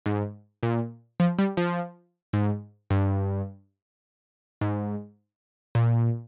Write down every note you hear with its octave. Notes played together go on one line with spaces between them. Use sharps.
G#2
A#2
F3
G3
F3
G#2
G2
G#2
A#2